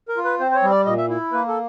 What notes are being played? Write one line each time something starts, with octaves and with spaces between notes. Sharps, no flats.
A#4
F4
B4
C4 C5
C5
C#5
G3
D5
A#2 D#5
E5
E4
A#3 B4
A4